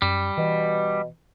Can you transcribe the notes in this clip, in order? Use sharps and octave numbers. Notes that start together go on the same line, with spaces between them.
F#2 G3
B2 E3